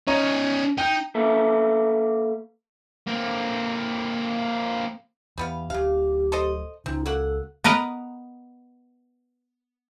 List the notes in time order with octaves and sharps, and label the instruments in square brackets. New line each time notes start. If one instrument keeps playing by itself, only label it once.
[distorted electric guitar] C#4 D#4 [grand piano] C#5 D#5 A#5
[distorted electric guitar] D#4 [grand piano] G5 G6
[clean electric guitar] A#3 A4 B4 E5
[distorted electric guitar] A#3 C4
[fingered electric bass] E2 [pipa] G3 B3 F5
[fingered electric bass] D1 [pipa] C#3 F5 [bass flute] G4
[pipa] A4 C5 D#5
[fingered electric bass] C#2 C#3 [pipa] C4 [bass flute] D#4
[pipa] A#3 F#4 F#5 [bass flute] A4
[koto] B3 A#4 B4 D#5 A#5